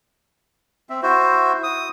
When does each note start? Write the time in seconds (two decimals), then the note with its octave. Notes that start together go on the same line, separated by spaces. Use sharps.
0.89 C4 E5
1.03 E4 F#4 C5
1.63 D#6